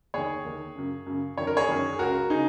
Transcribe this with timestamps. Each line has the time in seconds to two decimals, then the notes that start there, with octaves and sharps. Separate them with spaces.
0.14 D#2 D#3 G#4 C#5
0.45 D#2 D#3
0.76 F#2 C#3
1.07 F#2 C#3
1.38 F#2 D#3 C#5
1.47 A#4
1.57 G#4 C#5
1.69 F#2 D#3
1.93 G#4
1.99 C#2 C#3 F#4 A#4
2.30 C#3 D#4 G#4